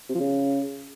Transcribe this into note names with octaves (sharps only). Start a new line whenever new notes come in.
C3
F3
C#3